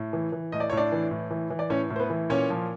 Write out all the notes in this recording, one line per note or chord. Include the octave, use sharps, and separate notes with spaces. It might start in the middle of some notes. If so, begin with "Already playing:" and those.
Already playing: A2
E3
E3
A2 D#5
D5
A2 C#5
D4 D5
E3
A2
E3
E3
D5
A2 C#4 C#5
A2
C5
B3 B4
E3
A#2 C#4 C#5
F3